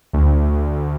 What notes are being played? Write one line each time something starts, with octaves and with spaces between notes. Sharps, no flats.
D2